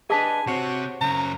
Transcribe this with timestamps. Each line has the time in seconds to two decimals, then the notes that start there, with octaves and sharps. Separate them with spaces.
0.10 D4 G#4 B4 D#5 G#5 A5
0.47 C3 C4 F#4 C5 C#5
1.01 F#2 C#3 A#5